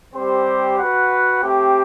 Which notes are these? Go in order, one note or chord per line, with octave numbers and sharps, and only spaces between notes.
G3 C4 G4 C5
F#4 B4 F#5
A3 C4 G4